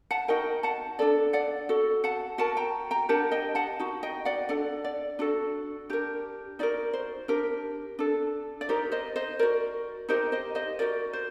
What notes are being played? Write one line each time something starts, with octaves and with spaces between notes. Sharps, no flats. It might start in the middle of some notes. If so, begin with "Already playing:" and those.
F#5 A5
D#4 F#4 A#4 D#5 G5
F#5 A5
D4 A4 D5
D5 F#5
F#4 A4
F#5 A5
F#4 A#4 F#5 A5
G5 A#5
G5 A#5
D4 G4 A#4 F#5 A5
D#5 G5
F#5 A5
D#4 F#4
D#5 G5
D5 F#5
D4 A4 D5 F#5
D5
D4 F#4 A4
D4 G4 A#4
D#4 F#4 A#4 D5
C5
D4 G4 A#4
D4 A4
D5
D#4 G4 A#4 C5
C5 D#5
C5 D#5
F#4 A#4 D5
D#4 G4 A#4 C5 D#5
C5 D#5
C5 D#5
F#4 A#4 D5
C5